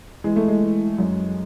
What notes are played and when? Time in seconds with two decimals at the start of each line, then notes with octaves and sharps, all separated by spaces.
0.24 E3 G#3
0.36 A3
0.48 G#3
0.61 E3
0.98 F#2